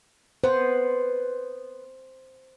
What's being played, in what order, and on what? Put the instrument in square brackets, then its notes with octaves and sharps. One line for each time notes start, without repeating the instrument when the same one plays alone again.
[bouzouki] B3 B4 [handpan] C5